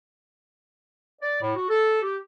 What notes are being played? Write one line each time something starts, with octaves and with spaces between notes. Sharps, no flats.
D5
A2
F#4
A4
G4